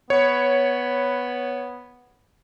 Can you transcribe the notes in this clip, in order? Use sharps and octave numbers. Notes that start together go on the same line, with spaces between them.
B3 C#5